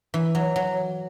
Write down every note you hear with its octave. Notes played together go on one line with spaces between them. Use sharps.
E3
F#3
F#3